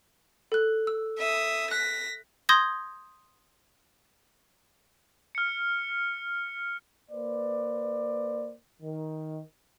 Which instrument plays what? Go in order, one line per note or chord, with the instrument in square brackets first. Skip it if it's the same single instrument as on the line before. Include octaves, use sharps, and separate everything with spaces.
[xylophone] A4 F#6
E6
[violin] E5 D#6
[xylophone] F#6 [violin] A#6 B6
[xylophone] C6 D#6 G6 G#6 A#6
[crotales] F6 C#7
[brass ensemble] A#3 B4 C5 D5
D#3